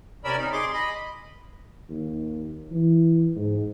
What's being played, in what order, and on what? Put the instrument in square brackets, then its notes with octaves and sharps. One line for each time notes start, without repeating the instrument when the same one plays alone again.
[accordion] C3 C#4 A#4 D5 B5 E6
D#4
G#4 C6 D6
D#5 B5
[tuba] D#2
E3
G#2